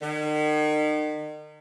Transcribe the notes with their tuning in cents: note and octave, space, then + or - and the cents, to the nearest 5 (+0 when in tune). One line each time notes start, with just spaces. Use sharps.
D#3 -40